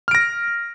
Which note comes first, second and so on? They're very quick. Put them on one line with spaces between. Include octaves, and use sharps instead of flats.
F6 D7 A#6